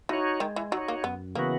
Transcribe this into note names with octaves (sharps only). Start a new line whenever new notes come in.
E3 D#4 F#4 C#5
D#3 G#3
E3
F#3 D#4 F#4 C#5
A#3
F#2 B3
C#3 E3 A#3 B3 F#4